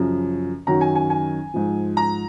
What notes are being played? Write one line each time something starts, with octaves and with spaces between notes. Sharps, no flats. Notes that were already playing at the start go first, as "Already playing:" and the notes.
Already playing: F#2 C#3 F3
F#2 D#3 F#3 A#5
G#5
G#5
G#5
G#2 F3
A#5